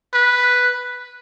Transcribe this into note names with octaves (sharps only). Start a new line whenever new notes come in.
B4